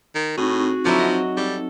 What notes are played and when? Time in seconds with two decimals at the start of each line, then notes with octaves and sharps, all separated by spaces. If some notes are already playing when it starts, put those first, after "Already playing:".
0.15 D#3 A#4
0.38 A2 C4 D#4 F#4 G#4
0.85 D3 F3 F#3 E4
0.99 D#5
1.37 G3 A4